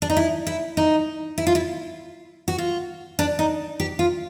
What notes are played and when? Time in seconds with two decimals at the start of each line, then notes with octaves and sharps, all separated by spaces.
0.02 D4
0.10 D#4
0.17 E4
0.47 E4
0.77 D#4
1.38 E4
1.47 F4
1.55 E4
2.48 F#4
2.58 F4
3.19 D4
3.39 D#4
3.80 G4
3.99 F4